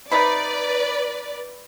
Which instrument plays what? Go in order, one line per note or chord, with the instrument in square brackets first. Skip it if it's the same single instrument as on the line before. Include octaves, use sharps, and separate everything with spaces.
[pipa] C3 D#4 B5 [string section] B4 D5